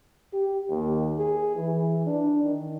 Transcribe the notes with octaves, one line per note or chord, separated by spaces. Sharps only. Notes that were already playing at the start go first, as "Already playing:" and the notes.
G4
D#2
G#4
E3
D4
D#3